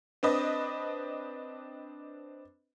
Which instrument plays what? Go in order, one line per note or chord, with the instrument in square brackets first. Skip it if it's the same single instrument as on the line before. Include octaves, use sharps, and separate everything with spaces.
[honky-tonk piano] C4 D4 B4 D#5